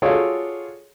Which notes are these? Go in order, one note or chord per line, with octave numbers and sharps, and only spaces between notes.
F4 F#4 G#4 A4 C#5 D5